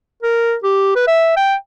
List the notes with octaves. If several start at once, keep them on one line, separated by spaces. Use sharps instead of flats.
A#4
G4
B4
E5
G5